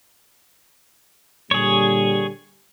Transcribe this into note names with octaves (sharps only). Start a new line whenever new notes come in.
A#2 D3 G3 G#4 C#5